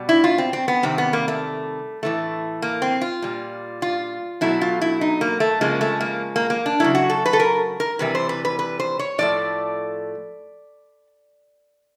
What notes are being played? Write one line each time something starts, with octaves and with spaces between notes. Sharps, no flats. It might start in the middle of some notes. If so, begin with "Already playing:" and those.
Already playing: B2 G3
E4
F4
C4
C4
B3
C3 D#3 G3 C4
B3
A#3
A3
A2 E3 A3
A#3
C4
F4
A#2 G3
F4
B2 F#3 A3 E4
F4
E4
D#4
A#3
A3
C#3 F3 G#3 A#3
A3
A#3
A#3
A#3
D4
C#3 F#3 A3 E4
F#4
A4
B4
A4
A#4
A#4
C3 E3 G3 B4
C5
B4
B4
B4
C5
C#5
A2 F3 A3 D5